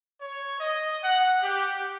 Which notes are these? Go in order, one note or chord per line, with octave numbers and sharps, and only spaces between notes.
C#5
D#5
F#5
G4